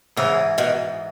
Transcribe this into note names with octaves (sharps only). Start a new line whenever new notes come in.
G#2 C#3 E3 B3 E4
B2 D#3